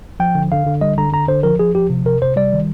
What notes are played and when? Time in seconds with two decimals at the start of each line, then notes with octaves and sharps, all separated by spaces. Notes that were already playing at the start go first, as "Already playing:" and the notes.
0.20 F3 G5
0.35 D3
0.52 D3 F5
0.66 D3
0.81 G3 D#5
0.98 D3 A#5
1.13 D3 A#5
1.28 D3 C5
1.43 F3 A#4
1.59 F3 G#4
1.75 F3 G4
1.90 C3
2.05 C3 A#4
2.22 C3 C5
2.36 G3 D5
2.53 D#3